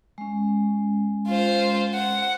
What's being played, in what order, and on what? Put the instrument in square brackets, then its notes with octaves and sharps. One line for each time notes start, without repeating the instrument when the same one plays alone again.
[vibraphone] G#3 C#4
[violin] F4 C5
F#5